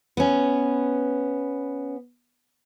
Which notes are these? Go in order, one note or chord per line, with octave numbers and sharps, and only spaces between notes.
B3 C#4